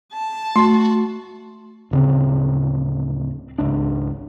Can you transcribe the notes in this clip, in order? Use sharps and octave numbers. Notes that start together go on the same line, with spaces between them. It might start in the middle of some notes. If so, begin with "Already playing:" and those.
A5
A3 F#4 C6
D1 C#3 C4
G#1 C#2 D4